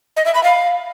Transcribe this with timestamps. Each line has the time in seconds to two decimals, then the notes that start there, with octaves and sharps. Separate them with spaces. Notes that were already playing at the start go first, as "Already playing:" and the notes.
0.17 D#5
0.26 E5
0.35 B5
0.44 F5